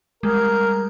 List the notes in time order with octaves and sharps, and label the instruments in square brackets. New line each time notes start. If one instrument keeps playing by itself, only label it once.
[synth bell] G3 G#3 [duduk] A#4